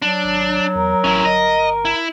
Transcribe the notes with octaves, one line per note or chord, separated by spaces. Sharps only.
F#3 D4
G#1
E2 A#4
A1 C#4 E4
G1 D#5
E4